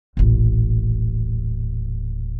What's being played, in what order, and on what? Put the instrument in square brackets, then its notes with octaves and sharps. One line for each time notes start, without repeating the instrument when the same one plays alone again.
[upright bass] D#1 A1